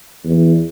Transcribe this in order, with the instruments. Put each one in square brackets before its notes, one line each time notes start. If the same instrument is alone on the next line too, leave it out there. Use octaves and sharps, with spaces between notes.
[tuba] E2